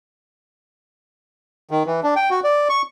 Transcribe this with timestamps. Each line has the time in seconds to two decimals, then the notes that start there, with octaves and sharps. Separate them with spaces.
1.71 D#3
1.86 E3
2.03 D4
2.16 G5
2.31 F#4
2.44 D5
2.69 C#6